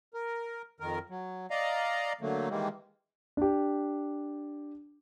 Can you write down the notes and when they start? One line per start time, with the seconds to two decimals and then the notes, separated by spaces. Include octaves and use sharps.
0.14 A#4
0.80 F2 D#3 A#4
1.10 F#3
1.50 D5 D#5 F5 A#5
2.21 D3 F#3 A3 A#3
2.50 D#3 E3 G3 G#3 A#3
3.37 D4 G4